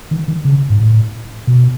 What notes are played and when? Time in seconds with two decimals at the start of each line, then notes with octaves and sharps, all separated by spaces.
0.11 D#3
0.28 D#3
0.45 C#3
0.70 G#2
0.80 A2
1.47 B2